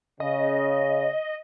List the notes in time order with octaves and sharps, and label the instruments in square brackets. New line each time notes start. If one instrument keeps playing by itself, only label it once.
[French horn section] C#3 [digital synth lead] D#5